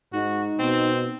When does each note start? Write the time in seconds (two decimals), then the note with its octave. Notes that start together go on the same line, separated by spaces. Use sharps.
0.13 G#2 D#4 F#4
0.59 B2 C4